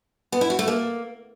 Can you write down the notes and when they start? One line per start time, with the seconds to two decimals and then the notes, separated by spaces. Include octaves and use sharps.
0.32 B3
0.41 E4
0.50 F#4
0.59 A3
0.68 A#3